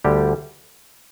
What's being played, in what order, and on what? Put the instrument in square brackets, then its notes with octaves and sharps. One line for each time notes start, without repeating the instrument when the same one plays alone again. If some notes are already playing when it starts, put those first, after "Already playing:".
[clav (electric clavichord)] D2 D3 G3 G4